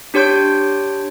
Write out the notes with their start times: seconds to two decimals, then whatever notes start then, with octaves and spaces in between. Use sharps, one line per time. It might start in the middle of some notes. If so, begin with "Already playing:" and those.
0.14 D4 G4 C#5 C6 G6 D7